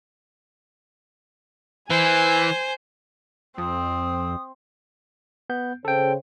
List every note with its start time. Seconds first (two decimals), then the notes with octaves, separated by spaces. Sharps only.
1.90 E3 C5 G#5
3.58 F2 C4 D#6
5.50 B3 G6
5.85 C#3 A4 C5 G5